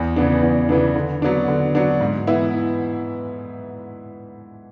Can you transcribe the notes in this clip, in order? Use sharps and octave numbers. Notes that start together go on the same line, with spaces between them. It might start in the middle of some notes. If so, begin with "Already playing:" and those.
Already playing: E2
C#3 E3 B3 D4
E2
C#3 E3 B3 D4
D3
F#3 B3 D4
D3
F#3 B3 D4
G#2
E3 B3 E4